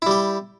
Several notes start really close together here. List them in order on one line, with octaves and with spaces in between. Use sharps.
E4 G3 G4